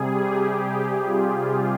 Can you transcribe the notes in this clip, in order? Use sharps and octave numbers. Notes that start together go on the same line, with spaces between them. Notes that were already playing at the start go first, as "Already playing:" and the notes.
Already playing: C3 G3 G#4
G4
F4